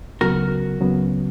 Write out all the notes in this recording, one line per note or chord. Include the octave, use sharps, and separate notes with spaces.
C#2 C#3 F#3 B3 F#4 A#4
C#2 C#3 F#3 B3